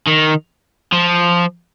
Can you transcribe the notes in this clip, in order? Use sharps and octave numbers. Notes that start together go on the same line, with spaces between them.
D#3
F3